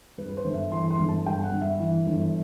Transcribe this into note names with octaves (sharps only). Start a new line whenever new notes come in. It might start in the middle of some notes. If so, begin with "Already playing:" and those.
G2 B4
B4
C5
G1
E5
E3 C6
C6
G1
A5
G2 G5
F#5
G1
E5
E3
G1